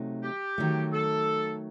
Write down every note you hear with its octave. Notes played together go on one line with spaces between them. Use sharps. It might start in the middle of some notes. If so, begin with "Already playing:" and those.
Already playing: C3 F#3 A3 D#4
G4
D#3 F#3 A3
A4